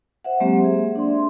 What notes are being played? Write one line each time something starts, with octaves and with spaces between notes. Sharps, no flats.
C5 E5 F#5
F#3 G#3 A#3 C4 G4
G#4 E5
D4 D5 C6